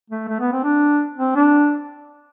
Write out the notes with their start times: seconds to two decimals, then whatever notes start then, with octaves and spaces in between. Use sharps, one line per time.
0.10 A3
0.28 A3
0.40 B3
0.52 C4
0.64 D4
1.17 C4
1.35 D4